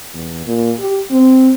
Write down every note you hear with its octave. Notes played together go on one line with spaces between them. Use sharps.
E2
A#2
G4
C4